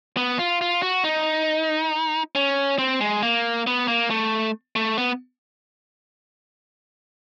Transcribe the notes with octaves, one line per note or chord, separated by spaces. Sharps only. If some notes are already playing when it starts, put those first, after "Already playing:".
B3
F4
F4
F#4
D#4
C#4
C4
G#3
A#3
B3
A#3
A3
A3
B3